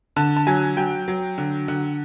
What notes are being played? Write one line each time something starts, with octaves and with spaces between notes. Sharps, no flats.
D3 A5
A5
F#3 G#5
F#3 G5
F#3
D3
D3 F#5